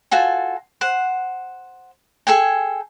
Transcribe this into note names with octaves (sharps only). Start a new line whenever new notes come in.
F4 F#4 A4 G#5
C5 F#5
G#4 A4 G5 G#5